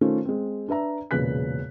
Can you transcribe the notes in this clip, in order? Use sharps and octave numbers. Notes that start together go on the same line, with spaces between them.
D#3 A3 C#4 F4 A4 C5
G#3 C4
D4 B4 E5 A#5
E1 A#2 C#3 B4 F#6 B6